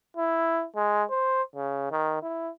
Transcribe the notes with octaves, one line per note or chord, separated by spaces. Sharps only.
E4
G#3
C5
C#3
D#3
E4